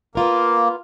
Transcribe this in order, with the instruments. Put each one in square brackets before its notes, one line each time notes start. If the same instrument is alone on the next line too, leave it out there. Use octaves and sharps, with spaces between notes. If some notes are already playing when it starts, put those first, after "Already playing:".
[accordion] A#3 [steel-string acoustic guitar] B3 F4 A#4